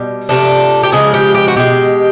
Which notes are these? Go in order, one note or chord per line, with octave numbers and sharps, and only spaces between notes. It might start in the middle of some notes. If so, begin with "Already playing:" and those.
Already playing: B2 G3
C3 F3 A3 D4
G4
C#3 F3 G#3 G#4
G4
G4
F#4
B2 G#3 G4